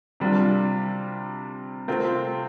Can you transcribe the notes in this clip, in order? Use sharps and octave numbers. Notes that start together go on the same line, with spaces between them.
C3 G3 D4 F4
C3 A3 C4 F4